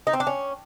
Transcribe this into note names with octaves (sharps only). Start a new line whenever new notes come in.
D#4
C4
D4
C#4